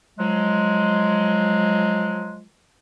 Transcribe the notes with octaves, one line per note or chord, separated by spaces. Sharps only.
F3 F#3 G#3